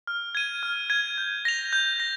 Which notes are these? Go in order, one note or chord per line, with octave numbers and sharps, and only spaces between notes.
F6
G#6 D#7
F6
G#6 D#7
G6
A#6 F7
G6
A#6